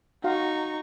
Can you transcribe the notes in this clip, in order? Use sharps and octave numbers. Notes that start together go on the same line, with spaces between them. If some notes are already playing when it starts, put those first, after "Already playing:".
D#4 F#4 F5 C#6